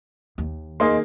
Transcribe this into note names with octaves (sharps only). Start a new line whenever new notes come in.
D#2
A#3 D#4 G#4 D#5 C6